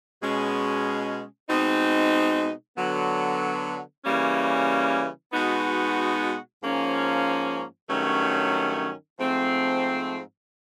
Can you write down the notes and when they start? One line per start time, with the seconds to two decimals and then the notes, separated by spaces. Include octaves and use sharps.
0.21 B2 G#3 C#4
1.49 B2 G#3 C4 D#4
2.77 D3 F#3 B3
4.05 C#3 E3 G3 A#3 C#4
5.33 B2 G#3 B3 D#4 F#4
6.61 G#2 F3 A#3 C#4
7.89 G2 D#3 F#3 A3 C#4
9.18 G#2 F3 A3 C4